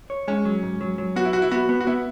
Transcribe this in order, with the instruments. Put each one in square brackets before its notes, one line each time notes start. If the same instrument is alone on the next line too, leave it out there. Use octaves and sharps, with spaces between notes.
[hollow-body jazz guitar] C#5
[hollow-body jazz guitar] G#3 [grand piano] C#4
[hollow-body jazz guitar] F#3
G#2
F#3
F#3
[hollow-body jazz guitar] B3 [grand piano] F#4
[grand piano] E4
[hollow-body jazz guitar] B1 [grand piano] F#4
[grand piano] E4
[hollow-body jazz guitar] B3 [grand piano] F#4
[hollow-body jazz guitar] B3
[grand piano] F#4
[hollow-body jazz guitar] B3 [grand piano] E4